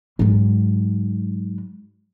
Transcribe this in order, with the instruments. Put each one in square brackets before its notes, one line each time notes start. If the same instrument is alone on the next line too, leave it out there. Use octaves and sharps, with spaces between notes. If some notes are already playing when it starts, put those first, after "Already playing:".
[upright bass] G#2 F#3